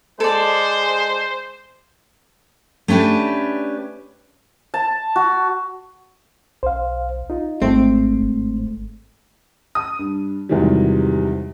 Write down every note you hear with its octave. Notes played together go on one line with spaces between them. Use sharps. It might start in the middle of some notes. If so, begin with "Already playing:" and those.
G#3 A4 C5 D5
A3 C#4 D4 G4 B4
A5
F#4
B1 C5 F5
D#4 F4
G#1 G#2 G#3 A3 C4
G1
D#6
G2
E2 G#2 C3 D#3 F#3 G3